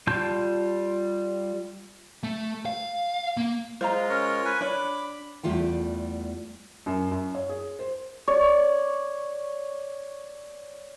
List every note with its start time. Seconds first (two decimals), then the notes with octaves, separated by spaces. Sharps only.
0.07 G3 F4 A5 C6 G6
2.23 A3
2.66 F5
3.37 A#3
3.81 G#3 F4 C5 F5 A#5
4.09 C#4 A#4 C#5
4.45 B4 G#5
4.61 D4 C#5 B5 D6
5.43 E2 G3 A3 F4 G5
6.86 F#2
7.12 F#2
7.35 C#5
7.49 G#4
7.79 C5
8.27 C#5 D5